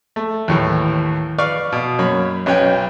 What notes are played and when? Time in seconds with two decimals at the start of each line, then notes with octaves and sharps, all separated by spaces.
0.16 A3
0.48 D#2 A2 E3
1.38 B4 D5 F5 C#6
1.72 B2
1.99 F#2 A#3 C#5 B5
2.46 B1 C#4 B4 C#5 G5